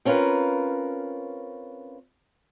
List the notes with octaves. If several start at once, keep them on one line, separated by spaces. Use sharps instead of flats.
C4 C#4 F4 A#4 B4